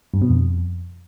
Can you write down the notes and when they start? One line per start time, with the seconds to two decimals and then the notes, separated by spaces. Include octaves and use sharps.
0.14 G2
0.22 B2
0.30 F2